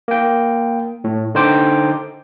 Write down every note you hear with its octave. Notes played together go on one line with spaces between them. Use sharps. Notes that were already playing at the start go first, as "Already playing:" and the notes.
A#3 G5
A2
D3 D#4 C5 G5 D6